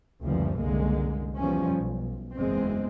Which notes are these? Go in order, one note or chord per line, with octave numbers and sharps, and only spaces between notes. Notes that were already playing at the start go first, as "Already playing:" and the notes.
F#1 D2 E3 F3 G3
F#1 C2 D3 G#3 A#3
E2 F3 G3 C#4
B1
F#1 E2 G#3 C4